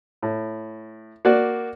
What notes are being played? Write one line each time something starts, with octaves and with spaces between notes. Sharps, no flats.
A2
A#3 F#4 D5